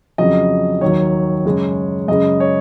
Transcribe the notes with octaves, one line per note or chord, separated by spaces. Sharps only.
F2 C#3 F#3 D#5
D#2 D#3 F#3 C#5
F#2 C#3 G#3
F#2 C#3 G#3 D#5
C#5